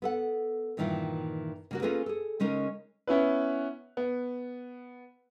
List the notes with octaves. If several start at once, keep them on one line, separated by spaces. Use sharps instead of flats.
B3 A4 F#5
G2 A#2 D#3 E3 E4 F4
C#3 A#3 F#4
A#3 C#4 F4 G#4 A4 B4
G#4 A4
C#3 G#3 C#4 D#4 A#4
B3 C#4 E4 B4
B3